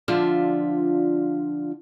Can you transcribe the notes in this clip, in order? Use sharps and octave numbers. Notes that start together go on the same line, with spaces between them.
D3 F3 D4 F4 E5